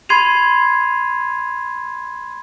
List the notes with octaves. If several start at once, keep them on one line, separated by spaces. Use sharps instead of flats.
B5 C6 G#6 C7 D#7 F7